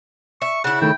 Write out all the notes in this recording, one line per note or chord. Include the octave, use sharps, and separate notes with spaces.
E5 C#6
C#3 E4 F#5
D#3 A3 G5